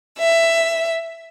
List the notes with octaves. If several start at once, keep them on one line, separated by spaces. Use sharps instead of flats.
E5